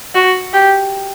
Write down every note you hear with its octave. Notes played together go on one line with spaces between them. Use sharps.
F#4
G4